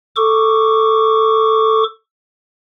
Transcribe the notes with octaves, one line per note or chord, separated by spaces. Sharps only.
A4 C#6 D6